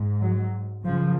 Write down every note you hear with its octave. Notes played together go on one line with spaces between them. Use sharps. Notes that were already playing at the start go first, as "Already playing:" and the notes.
Already playing: G#2
F#3
F#2 C#3 F3